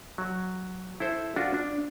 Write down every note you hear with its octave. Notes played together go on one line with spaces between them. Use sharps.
F#3
E4 A4 C5
D4 F4 F#4
D4